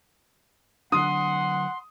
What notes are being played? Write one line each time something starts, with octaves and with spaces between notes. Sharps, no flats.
D3 F#3 D4 F#5 C6 D#6